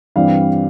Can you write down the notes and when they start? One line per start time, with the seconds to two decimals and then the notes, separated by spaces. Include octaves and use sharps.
0.16 G2 E3 G3 C4 F5